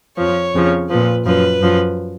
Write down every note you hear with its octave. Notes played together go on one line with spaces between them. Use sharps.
F2 F3 C#5
F2 C#3 F3
A#2 F3 B4
F#2 F3 B4
F#2 F3